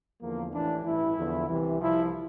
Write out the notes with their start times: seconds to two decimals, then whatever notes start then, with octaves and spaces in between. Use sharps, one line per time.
0.21 E2 D3 F3 A#3
0.53 A1 A2 E3 D4
0.84 A1 G2 E3 E4
1.16 E2 D3 F3
1.48 C2 C3 E3
1.80 C2 C3 F3 E4